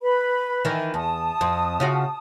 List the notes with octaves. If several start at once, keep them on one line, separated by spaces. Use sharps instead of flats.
B4 B5
D#3 E3
E2 A5 D#6
F2
C#3 F4 F#4